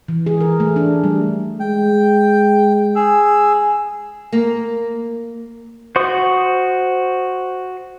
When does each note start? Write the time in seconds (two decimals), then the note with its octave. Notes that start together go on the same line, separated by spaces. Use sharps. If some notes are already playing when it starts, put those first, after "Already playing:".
0.08 E3
0.26 G#4
0.41 A#4
0.60 A3
0.76 D4
1.04 G3
1.60 G#3 G5
2.96 G#4 E6
4.32 A#3
5.96 F#4 C5 C6 C#6 D#6